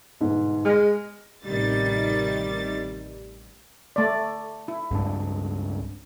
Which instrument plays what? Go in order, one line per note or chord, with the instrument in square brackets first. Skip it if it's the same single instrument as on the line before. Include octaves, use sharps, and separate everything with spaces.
[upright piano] G1 G#2 B2
[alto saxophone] G#3 [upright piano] F6 A#6
[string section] A1 C3 D#3 G3 A6
[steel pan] A3 D5
E4
[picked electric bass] C#2 G2 D4